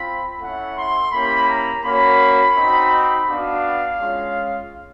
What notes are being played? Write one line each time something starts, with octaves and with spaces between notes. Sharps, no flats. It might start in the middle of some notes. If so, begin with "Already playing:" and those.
Already playing: C4 F4 B5
A3 C#4 E4 F#5
C6
A#3 C#4 E4 G4 B5
A#5
A#3 C#4 F#4 B5
C4 D#4 F#4
B3 D4 F#4 F5
G#3 C#4 F4